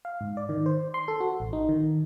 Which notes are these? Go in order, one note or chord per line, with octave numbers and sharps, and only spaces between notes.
F5
G#2
D5
D#3
C5
C6
A4
F#4
A1
D#4
D#3